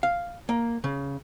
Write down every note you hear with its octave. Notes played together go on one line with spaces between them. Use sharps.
F5
A#3
C#3